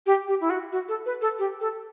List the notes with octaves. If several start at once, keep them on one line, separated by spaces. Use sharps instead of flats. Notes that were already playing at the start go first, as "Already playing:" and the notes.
G4
G4
E4
F#4
F#4
A4
B4
A4
G4
A4